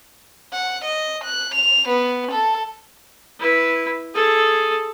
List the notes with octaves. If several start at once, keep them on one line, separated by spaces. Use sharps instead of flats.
F#5
D#5
F#6
F7
B3
A4
E4 B4
G#4 A4